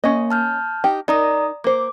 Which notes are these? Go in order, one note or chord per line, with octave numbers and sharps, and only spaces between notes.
A#3 C#4 D#5
A5 F6 G6
D#4 G4
D#4 A#4 D5 A#5 D#6
A#3 C5 D6